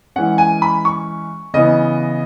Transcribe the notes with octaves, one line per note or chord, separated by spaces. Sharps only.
E3 G#3 C#4 F#5
G#5
B5
C#6
C#3 E3 B3 D#5